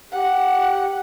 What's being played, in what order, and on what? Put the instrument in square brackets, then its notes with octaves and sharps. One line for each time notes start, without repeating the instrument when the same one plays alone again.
[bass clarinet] G4 [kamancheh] F#5